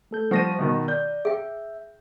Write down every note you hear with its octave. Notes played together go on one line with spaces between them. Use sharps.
A3 A4 G6
F3 G3 F#5 C#6 A#6 D#7
B2 D#3
D5 G6
G#4 E5 G5